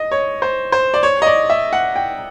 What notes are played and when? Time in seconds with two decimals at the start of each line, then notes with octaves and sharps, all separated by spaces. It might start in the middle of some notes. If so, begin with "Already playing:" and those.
Already playing: D#5
0.12 C#5
0.42 C5
0.72 C5
0.94 D5
1.03 C#5
1.22 D#5
1.26 D5
1.50 E5
1.73 F#5
1.96 G5